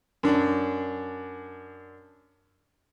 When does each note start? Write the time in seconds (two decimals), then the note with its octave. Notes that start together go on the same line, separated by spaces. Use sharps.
0.23 F#2 D4